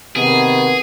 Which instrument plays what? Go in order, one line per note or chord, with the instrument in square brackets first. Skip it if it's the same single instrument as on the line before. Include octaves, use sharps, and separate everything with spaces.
[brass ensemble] C3 D#3 B3 [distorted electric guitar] G#4